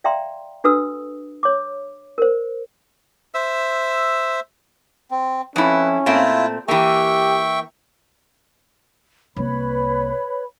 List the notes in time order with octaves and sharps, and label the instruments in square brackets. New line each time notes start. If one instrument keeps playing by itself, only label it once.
[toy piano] D5 E5 F5 G5 A#5 C6
D4 F#4 A4 B4 D#6 E6
C#5 D6
A#4 C5
[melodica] C5 E5 E6
C4
[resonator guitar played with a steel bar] F2 E4 [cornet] C#4 [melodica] B4
[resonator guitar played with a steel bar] A#2 A3 C4 [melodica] E4 F4
[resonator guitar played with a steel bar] E3 A#3 [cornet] G4 [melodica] E5 G5 C#6
[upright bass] C2 A#3 [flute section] B4 C#5 B5